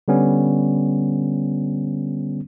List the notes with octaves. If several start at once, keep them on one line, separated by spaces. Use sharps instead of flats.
D3 G3 B3 C#4